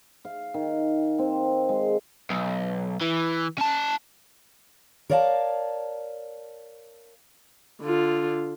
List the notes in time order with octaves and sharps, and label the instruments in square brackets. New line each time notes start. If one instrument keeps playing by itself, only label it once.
[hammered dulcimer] F5
D#3
C4
G#3
[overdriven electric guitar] B1
E3
C#4 A5
[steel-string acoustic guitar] A#4 C#5 D5 F5 G5 A5
[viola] D3 F4